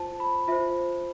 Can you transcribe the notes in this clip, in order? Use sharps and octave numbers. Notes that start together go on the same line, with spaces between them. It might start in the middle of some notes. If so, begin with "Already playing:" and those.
Already playing: F4 C5 A5
B5
F4 C5 E5